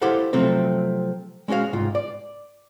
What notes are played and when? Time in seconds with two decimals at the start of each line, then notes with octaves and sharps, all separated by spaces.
0.02 E4 G4 A4 C5 F5 F#5
0.33 C3 F3 F#3 A3 C4
1.48 G#3 C#4 D#4 F#4 F5
1.73 C2 G#2 F4
1.95 D5